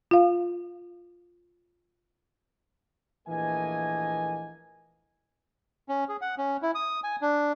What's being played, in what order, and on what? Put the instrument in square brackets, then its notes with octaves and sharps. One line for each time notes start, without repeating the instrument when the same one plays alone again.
[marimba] F4 F5
[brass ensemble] A#1 E3 A3 A#3 D#5 G#5
[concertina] C#4
G#4
F#5
C#4
E4
D#6
G#5
D4